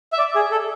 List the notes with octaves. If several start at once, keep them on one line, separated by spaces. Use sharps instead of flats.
E5
D5
G#4
A4